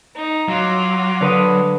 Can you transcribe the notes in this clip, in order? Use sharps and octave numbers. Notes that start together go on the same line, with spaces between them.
D#4
F#3 F4 D6
D3 B4 D#6